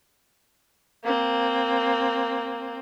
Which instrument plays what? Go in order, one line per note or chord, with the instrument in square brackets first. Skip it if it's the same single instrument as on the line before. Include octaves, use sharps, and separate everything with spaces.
[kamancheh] A#3 C4